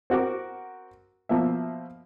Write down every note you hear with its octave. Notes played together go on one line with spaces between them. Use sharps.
C4 F#4 A#4 D6
B2 F3 A#3 E5